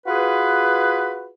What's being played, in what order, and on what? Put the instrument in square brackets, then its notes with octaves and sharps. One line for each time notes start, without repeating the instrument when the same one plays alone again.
[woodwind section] F4 F#4 G#4 B4